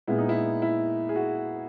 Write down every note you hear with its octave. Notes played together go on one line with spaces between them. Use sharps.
A#2 G#3 B3 E4
D#4
E4
E4
G#4
F#4